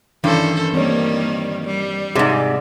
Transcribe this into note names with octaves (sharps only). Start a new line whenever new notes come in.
G2 D#3 E3 C#4 D4 A4 C5
D#3 G3 A#3 C4 C#5
G3
G#2 C3 G#4 D5 D#5